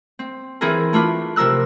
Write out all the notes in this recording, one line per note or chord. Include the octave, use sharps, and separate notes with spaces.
C4
E3 C4 E4 G#4 A#4
A3 D4 F4 B4
C3 F3 A#4 E6 F#6